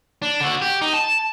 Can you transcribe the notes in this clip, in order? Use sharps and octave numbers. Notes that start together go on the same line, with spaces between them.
D4
D3 F#4
G4
D#4
A5